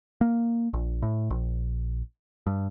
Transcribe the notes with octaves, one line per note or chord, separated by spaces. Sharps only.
A#3
A#1
A2
A#1
G2